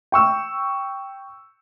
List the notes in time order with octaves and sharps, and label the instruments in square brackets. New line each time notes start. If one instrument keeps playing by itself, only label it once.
[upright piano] G5 C#6 E6